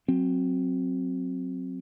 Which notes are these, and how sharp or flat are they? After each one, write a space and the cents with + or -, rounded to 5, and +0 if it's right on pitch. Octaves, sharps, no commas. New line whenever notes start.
F#3 -10 C4 +10